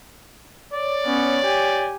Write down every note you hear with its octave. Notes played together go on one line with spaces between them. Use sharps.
C#5 D5
B3 C#4
G4 G#5